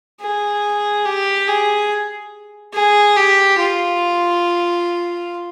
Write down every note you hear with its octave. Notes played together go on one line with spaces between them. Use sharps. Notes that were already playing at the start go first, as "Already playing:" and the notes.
G#4
G4
G#4
G#4
G4
F4